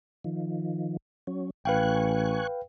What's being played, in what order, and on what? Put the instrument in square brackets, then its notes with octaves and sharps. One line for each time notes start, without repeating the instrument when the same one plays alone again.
[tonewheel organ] D#3 F3
F#3 C#4
[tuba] A1 [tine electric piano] B4 F5 G5 [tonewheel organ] G#5 C#6 F#6